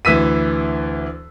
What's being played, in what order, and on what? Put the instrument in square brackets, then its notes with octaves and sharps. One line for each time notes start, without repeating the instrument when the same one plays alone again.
[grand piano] D2 E3 E6 B6 D#7